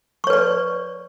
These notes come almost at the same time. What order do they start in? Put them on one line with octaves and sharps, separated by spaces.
C#6 C#5 B4 D5